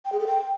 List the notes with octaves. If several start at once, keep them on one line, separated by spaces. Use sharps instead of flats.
G5
G#4
A4
G5